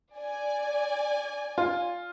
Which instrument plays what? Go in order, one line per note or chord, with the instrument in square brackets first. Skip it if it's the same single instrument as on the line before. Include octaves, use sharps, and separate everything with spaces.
[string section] D5 G#5
[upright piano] F4